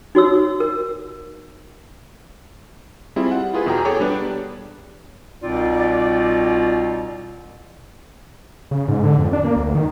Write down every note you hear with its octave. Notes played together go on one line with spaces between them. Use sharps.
D#4 F#4 C#5 E6
A#4
G3 C4 E4 F4 G#4
F#5
E4 F4 G#4 B4
E2 B2 G#4 G5 A#5
G#4 A4 C#5 G5 D6
G3 B3 D4 B4 D5
C2 B2 C4 D#4 F4 D5
C#3
G#2
D3
F2
D4
A#3
D2
D#3